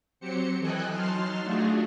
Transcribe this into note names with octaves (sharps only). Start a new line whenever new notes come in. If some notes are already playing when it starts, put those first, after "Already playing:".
F#3 C4 G4 C5 C#7
E3 A4 D#5 G5 G#5 F#6
F#3 D#4 A5 C6 F6
A3 D4 F4 F#4 G#4